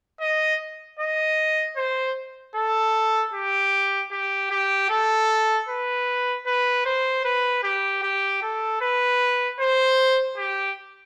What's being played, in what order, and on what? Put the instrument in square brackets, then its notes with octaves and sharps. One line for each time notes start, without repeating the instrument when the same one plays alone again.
[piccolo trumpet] D#5
D#5
C5
A4
G4
G4
G4
A4
B4
B4
C5
B4
G4
G4
A4
B4
C5
G4